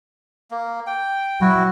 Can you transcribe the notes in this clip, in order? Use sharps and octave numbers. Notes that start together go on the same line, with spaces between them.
A#3
G5
F#3 E4 F#4